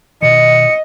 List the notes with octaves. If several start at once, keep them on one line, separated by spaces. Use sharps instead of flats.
B2 D#3 D#5 C#7